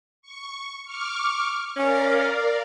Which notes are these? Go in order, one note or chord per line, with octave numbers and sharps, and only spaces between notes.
C#6
C#6 D6 F6
C#4 A#4 D5 F5